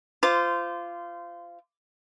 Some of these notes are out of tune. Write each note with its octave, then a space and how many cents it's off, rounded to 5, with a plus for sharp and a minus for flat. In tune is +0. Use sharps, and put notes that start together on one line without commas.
F4 -15 C5 -20 D6 +0